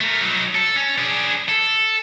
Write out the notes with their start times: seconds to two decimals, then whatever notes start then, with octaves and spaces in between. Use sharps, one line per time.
0.01 A3 A#4
0.21 F#3 D#4
0.55 A4
0.76 C#4
0.98 D4 G#4
1.49 A4